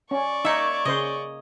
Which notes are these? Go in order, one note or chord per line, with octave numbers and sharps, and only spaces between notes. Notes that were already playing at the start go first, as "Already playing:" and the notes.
C#4 D5 C#6
A#3 D#4 C#5 E5
C#3 C5 D#5